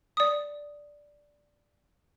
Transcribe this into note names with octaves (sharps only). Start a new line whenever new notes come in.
D5 D#6